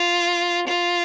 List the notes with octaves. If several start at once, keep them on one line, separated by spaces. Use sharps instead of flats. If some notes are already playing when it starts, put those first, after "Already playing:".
Already playing: F4
F4